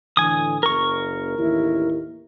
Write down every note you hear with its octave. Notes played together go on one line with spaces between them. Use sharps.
A2 D3 E3 G#5 D#6
F#1 A#4 C#6
A1 D#2 E4